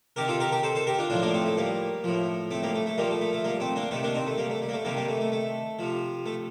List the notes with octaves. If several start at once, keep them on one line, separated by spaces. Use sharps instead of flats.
C3 D#3 G4 A#4
F4 A4
G4 A#4
G4 A#4
A4 C5
A4 C5
G4 A#4
D4 F4
A2 F3 D4 F4
A#3 D4
A3 C4
A3
G3 A#3
A2 F3
A3 C4
G3 A#3
A3
A3
A#2 F3 G3 A#3
A3
A3
A3
G3 A#3
A3 C4
A#3 D4
C3 D#3 A3 C4
A#3 D4
C4 D#4
A3
G3 A#3
A3
G3
A#3
A3
C3 D#3 G3 A#3
G3 A#3
A3
A3
A3
C3 F3
A3